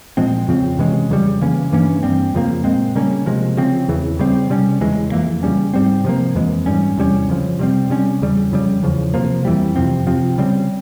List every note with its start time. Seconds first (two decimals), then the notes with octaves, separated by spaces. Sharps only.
0.17 A#2 F3 G#3 C4
0.48 F2 C#3 F3 C4
0.79 C3 E3 G#3 C#4
1.10 F2 C#3 G3
1.41 C#3 E3 A#3 C#4
1.72 G2 E3 A#3 C#4
2.03 G2 G3 C4
2.34 F2 C#3 F3 A#3
2.64 A#2 G#3 C4
2.95 C#3 G3 A#3 C#4
3.26 C3 F3 G#3
3.57 C#3 F3 C4
3.88 E2 C#3 E3
4.19 C#3 G3 C4
4.50 C3 G3 C#4
4.81 E2 C#3 E3 G#3
5.12 F2 E3 A#3
5.43 C#3 G3 C#4
5.73 G#2 G3 C4
6.04 C3 F3 A#3
6.35 F2 E3 G#3
6.66 G#2 G3 C#4
6.97 E2 C3 G3 C#4
7.28 F2 C#3 F3
7.59 C3 G3 C4
7.90 C3 G3 C#4
8.21 E2 C#3 G3
8.52 F2 C#3 G3
8.83 E2 C#3 F3
9.14 C3 F3 A#3
9.45 F2 E3 G3
9.76 F2 C3 F3 C4
10.07 C3 F3 C4
10.38 C#3 G3 C4